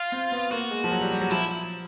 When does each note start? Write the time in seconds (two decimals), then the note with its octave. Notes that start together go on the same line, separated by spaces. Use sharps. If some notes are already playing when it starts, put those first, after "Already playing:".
Already playing: F4
0.12 C4
0.32 B3
0.51 A#3 F#4
0.71 G#3
0.84 F3
0.92 F#3
1.01 G3
1.12 G3
1.21 F#3
1.31 F3 E4